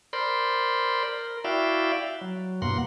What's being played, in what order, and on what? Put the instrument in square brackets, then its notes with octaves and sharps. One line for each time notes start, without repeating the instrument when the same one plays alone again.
[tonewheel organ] A#4 C5 D5 B5 C6
A#4
E4 F#4 D5 E5 F5 G5
F#3
E2 G2 B2 A#3 F#5 C6